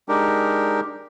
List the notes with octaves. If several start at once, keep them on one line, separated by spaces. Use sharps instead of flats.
G#3 D4 D#4 G4 A#4